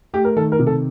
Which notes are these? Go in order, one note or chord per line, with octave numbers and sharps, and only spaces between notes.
A3 G4
A#4
D#3 A4
A#4
C3
A4